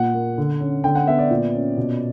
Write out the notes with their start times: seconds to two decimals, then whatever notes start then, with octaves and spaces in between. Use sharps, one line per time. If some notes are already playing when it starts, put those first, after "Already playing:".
Already playing: A#2 F#5
0.14 A#3
0.38 D3
0.60 C#4
0.84 D3 G5
0.95 F#5
1.07 B3 E5
1.19 D5
1.31 A#2
1.54 C#4
1.77 B2